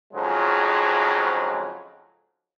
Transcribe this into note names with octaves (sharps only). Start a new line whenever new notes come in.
F2 G#2 C#3 F3 F#3 G#3